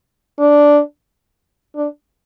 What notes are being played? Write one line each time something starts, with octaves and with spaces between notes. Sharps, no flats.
D4
D4